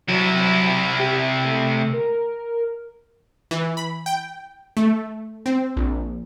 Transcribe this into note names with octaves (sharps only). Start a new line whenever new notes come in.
C3 F#3 E4
F6
G4
A3
A#4
E3
B5
G5
A3
C4
A#1